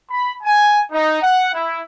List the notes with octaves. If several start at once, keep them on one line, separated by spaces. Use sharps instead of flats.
B5
G#5
D#4
F#5
E4